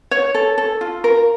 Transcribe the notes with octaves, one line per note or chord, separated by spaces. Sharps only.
C#5
A4
A4
F4
A#4